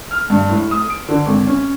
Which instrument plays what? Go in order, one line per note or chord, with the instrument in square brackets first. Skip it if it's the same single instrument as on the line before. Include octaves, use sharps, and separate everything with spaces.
[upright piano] F6
G2
A2
D#6
D7
D3
G#1
C#4